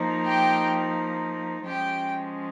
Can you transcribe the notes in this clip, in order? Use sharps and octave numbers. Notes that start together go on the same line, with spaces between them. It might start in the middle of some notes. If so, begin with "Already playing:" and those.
Already playing: F3 A#3 D#4
G4 G5
F3 G#3 C#4 G4 G5